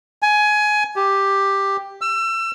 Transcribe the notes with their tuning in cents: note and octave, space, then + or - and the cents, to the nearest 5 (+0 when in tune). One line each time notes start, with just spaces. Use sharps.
G#5 +20
G4 +5
E6 +30